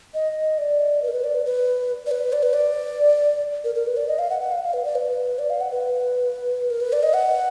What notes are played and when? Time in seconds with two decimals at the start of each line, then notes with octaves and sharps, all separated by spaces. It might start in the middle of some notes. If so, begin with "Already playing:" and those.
0.14 D#5
0.58 D5
1.02 B4
1.08 A#4
1.13 B4
1.24 D5
1.35 B4
1.46 B4
2.06 D5
2.11 B4
2.33 D5
2.43 B4
2.53 D5
3.64 A#4
3.75 A#4
3.87 B4
3.97 D5
4.08 D#5
4.19 F5
4.30 F#5
4.41 F#5
4.52 F5
4.63 F5
4.73 B4
4.85 D5
4.95 B4
5.39 D5
5.50 F5
5.61 F#5
5.71 B4
6.71 A#4
6.81 B4
6.93 D5
7.03 D#5
7.14 F#5